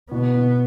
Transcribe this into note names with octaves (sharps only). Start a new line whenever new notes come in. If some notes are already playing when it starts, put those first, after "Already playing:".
B2 B3
B2